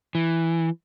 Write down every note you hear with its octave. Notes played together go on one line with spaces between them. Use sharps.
E3